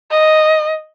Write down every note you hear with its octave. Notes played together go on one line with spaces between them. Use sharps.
D#5